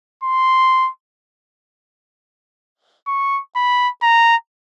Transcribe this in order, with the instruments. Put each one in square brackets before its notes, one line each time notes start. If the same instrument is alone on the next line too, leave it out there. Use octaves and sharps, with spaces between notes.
[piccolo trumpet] C6
C#6
B5
A#5